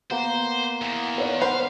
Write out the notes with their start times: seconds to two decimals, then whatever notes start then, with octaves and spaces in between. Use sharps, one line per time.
0.11 A#3 B3 C5
0.82 E2 E3
1.18 B4 C#5 D5
1.42 B4 C5 F5 F#5 B5